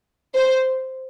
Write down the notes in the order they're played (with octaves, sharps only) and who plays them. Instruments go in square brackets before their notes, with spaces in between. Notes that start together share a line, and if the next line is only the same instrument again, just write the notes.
[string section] C5